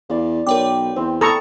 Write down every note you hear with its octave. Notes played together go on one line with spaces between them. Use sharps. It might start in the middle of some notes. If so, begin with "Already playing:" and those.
E2 D5 F5
B1 A#4 C#5 G5 D6
E2 C4
A4 A#5 B5 C#6 D#6